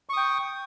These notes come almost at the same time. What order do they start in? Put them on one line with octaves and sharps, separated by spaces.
C#6 D#6 G5